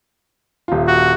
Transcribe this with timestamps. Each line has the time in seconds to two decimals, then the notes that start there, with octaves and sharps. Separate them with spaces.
0.68 D#1 F4
0.88 F#4